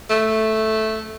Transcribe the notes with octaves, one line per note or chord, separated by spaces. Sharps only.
A3